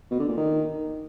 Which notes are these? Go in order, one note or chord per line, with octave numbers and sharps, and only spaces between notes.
B2
D3
A#2
D#3